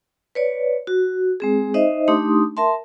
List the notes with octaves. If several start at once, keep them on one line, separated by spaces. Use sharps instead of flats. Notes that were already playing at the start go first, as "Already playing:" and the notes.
B4 C#5 D5
F#4
G#3 C4 G#4
D#4 C5 D#5 E5
A3 D4 D#4 G4 C6 D#6
A#4 E5 A5 C6